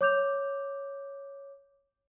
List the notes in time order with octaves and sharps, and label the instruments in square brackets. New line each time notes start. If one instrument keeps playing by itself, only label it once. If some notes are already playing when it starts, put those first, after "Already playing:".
[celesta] C#5 D6 G6 F7